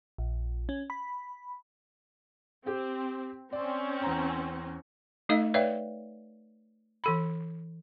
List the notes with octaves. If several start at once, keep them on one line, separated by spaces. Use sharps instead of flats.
A#1
C#4
B5
C4 G4 G5
C4 C#4 D5
E2 A#5
A3 D#4 A4 D#5 F5
B4 C#5 D5 E5 F5 G5
E3 A4 B5